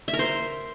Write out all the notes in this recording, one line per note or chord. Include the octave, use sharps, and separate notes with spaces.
E5
A#4
C5